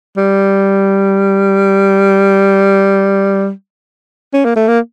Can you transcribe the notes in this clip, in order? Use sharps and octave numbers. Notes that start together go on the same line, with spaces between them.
G3
C#4
A#3
A3
A#3